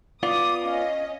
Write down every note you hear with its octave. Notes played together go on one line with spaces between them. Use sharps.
B3 F4 D5 D6 D#6
C#4 D#5 F5